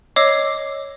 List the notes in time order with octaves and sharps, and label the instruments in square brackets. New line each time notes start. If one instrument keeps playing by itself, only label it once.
[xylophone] C#5 D#5 D6 E6 C7